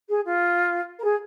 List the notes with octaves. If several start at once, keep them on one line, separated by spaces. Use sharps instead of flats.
G#4
F4
A#4
G#4